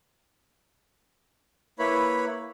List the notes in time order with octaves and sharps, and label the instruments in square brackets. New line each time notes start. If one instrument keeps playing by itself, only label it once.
[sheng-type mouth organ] A#3 E4 B4 C#5 B5